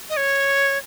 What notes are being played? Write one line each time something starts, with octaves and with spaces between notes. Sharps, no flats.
D#5
C#5